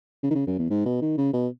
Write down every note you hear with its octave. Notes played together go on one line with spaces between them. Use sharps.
C#3
D#3
C#3
F#2
E2
G#2
B2
D#3
C#3
B2